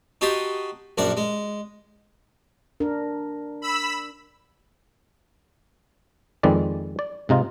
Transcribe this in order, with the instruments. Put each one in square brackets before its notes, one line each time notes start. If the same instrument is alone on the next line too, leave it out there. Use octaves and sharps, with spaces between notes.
[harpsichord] D#4 F#4 G4 A5 C6 D#6
A#1 F#2 D4 A#4 F#5
G#3
[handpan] D4 A#4
[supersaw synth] B5 E6
[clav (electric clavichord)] F2 D#3 G#3 C4 B4 D5
D5
G#2 C3 D#4 F4